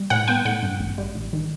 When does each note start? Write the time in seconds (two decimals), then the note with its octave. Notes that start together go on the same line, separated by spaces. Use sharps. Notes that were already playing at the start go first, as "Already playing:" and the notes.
Already playing: G3
0.10 A2 F#5
0.28 B3 G5
0.45 A2 F#5
0.63 G2
0.80 A1
0.98 G3
1.15 A1
1.33 D#3